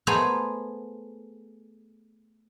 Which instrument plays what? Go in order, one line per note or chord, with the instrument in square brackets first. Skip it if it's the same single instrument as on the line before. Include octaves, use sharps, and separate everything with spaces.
[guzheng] A3 B3 G#4 C5 A#5